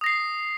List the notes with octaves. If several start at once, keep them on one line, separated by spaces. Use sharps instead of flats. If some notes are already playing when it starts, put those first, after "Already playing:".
D#6 A#6 C7